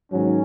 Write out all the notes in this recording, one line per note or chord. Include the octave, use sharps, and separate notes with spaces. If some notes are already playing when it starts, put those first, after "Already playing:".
G#2 D#3 F#3 C#4